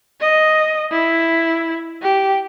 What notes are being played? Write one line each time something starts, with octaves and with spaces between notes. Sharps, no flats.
D#5
E4
G4